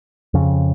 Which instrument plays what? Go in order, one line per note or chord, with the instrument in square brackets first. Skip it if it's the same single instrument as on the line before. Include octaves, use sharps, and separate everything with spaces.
[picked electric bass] F2 C#3